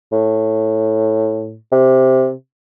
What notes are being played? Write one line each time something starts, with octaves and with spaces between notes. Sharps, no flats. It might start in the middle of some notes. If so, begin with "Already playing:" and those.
A2
C3